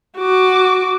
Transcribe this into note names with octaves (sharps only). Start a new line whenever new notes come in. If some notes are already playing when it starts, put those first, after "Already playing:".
F#4 D6